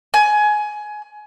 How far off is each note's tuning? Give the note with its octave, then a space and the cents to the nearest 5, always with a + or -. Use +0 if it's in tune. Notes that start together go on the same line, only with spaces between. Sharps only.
G#5 +20